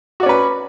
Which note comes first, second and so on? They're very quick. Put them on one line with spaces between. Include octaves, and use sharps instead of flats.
F#4 D5 C#4 B4